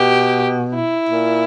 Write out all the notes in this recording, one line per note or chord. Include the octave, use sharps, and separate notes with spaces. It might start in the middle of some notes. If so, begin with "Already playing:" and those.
Already playing: B2 G4
E4
A#2